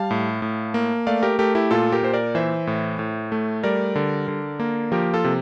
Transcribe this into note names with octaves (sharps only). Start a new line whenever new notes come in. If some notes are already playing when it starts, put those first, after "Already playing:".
Already playing: G3 F5 A5
A2
A2
A#3
A3 D5 F5
G4 A#4
A3 G4 A#4
E4 G4
A#2 F4 A4
G4 A#4
A#2 C5
A#4 D5
E3 C5 E5
A2
A2
A3
G3 A#4 D5
D3
D3
A#3
F3 G4 A#4
F4 A4
C3